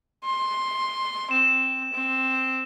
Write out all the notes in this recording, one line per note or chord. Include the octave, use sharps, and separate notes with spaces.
C6
C4 E7
C4